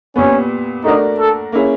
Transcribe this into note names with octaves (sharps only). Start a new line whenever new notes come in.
A#2 G3 B3 C#4
A3 D4 D#4 F#4 A#4 D5
A4
A#3 C#4 E4 G#4